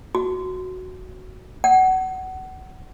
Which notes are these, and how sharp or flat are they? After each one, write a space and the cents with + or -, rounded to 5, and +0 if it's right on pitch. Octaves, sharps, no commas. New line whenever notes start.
F#4 +0
F#5 +25